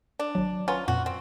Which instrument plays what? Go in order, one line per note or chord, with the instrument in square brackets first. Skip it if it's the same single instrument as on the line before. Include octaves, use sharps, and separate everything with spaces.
[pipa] D4
[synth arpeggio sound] G#1 F#3
[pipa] C#4 F4 [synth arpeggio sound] B4 F#5 A#5
[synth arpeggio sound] F2 A#2 [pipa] F#4
[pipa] C4